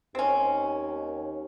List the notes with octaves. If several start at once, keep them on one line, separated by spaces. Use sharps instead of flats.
D#2 C4 C#4